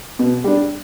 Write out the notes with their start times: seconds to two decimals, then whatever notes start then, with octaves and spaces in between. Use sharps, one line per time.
0.19 B2
0.44 G3 D4